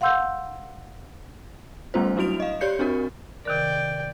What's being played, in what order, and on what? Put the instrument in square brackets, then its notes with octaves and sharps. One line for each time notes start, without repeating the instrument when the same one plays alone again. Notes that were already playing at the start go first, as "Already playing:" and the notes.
[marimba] F5 F#5 C6 E6 G6
[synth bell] G3 A3 B3 C#4 F4 C5
F#3 D4 E4 F#4 D7 F7
D#5 F5
G4 C#5 D5 G6 C#7
C4 D4 F#4 A#4
[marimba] C3 D#3 A#4 [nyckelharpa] D5 G5